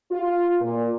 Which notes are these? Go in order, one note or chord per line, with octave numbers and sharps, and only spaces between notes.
F4
A#2